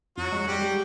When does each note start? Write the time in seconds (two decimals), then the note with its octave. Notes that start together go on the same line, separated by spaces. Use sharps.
0.17 F2 F#3 F#4
0.32 G#3
0.47 G3 G#3 G4
0.62 G#3